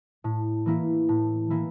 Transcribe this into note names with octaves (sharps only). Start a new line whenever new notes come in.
A2
E3 A#3 E4
A2
E3 A#3 E4